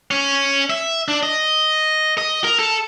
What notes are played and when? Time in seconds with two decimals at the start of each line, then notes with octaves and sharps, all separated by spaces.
0.11 C#4
0.70 E5
1.08 D4
1.23 D#5
2.18 D#5
2.44 A#4
2.59 A4